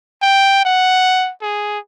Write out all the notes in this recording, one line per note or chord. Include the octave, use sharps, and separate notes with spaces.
G5
F#5
G#4